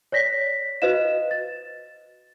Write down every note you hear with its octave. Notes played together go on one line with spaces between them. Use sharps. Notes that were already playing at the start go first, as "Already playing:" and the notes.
C#5 D5 A#6 B6
F#4 B4 C5 D#5 F5 E7
A6